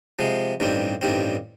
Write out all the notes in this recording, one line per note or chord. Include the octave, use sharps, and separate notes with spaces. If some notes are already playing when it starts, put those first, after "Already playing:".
C3 F3 G#3
A1 G2 D#3 G3 C4
A1 G2 D#3 G3 C4